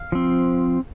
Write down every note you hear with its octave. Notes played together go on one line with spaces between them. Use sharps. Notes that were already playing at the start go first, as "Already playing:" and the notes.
Already playing: F5
F3 C4